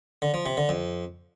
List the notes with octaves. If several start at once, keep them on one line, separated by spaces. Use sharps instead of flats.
D3
F3
C3
D3
F2